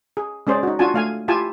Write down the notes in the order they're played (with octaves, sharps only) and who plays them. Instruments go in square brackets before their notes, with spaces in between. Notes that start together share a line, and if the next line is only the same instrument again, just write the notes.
[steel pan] G#4
G#3 C#4 G#4 C5 D5
D#4 F#4
D4 F4 F#4 G#5 A5
A3 F5 G#5
E4 F4 G4 G#5 A5